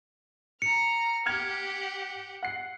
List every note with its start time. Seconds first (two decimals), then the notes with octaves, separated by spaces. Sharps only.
0.62 A#5 F6 C#7
1.26 G4 F#5 F6 G#6 F7
2.43 F#5 C7